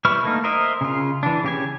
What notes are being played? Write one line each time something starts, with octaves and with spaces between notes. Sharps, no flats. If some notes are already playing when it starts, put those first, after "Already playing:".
G3 E4 B4 C#6 F6
A3 A#3 D#4
A#4 C5 D#5 E5
C#3 F4
E3 D4
C#3 G4 G#5